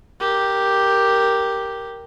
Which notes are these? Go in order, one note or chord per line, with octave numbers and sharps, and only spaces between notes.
G4 A#4